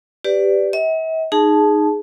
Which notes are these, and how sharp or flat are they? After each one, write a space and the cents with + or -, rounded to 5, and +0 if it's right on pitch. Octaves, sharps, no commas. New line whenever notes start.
G4 +0 B4 +20 D5 +0
E5 -45 G5 -35
D#4 -10 G#4 +0 A5 -15